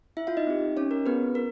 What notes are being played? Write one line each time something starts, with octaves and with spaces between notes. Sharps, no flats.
E4 E5
F4 F5
D#4 D#5
C4 D#4 G4
C#4 C#5
A#4
B3 C4 F4 G#4 B4
A#4